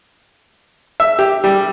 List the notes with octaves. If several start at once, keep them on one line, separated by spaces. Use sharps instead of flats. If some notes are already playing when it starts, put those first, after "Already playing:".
E5
G4
G3